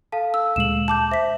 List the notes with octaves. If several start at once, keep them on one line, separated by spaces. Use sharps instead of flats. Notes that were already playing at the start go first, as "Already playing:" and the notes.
A4 F5 A5
E6
D2 A#2 G#3 E7 F#7
A5 D6 G6
C5 E5 B6